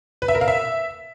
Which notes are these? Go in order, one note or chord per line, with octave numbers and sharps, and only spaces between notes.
B4
E5
A#4
F5
E5